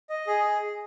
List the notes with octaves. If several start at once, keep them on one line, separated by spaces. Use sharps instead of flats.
D#5
G#4